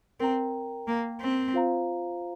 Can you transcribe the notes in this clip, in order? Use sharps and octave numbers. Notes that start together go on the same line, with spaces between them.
C4 A#4 G5 A#5
A#3
C4
F4 C5 F5 A#5